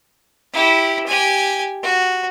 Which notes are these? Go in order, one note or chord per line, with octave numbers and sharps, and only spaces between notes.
E4 G4
G4 G#5
F#4